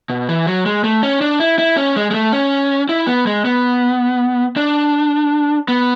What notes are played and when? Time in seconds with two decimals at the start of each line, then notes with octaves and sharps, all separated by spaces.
0.10 B2
0.29 E3
0.47 F#3
0.66 G#3
0.84 A3
1.03 C#4
1.21 D4
1.40 E4
1.59 E4
1.77 C#4
1.96 G#3
2.11 G#3
2.14 A3
2.32 C#4
2.89 E4
3.07 B3
3.27 G#3
3.45 B3
4.57 D4
5.68 B3